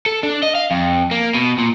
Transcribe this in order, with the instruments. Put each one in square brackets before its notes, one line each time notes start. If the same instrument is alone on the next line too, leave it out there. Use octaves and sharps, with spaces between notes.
[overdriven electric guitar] A4
D4
D#5
F5
F2
A#3
B2
A#2